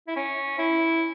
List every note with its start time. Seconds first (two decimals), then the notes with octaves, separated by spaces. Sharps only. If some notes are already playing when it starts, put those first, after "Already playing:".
0.08 E4
0.16 C#4
0.59 E4